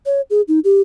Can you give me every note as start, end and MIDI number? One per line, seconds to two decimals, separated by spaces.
0.06 0.21 73
0.30 0.41 68
0.48 0.59 63
0.64 0.81 67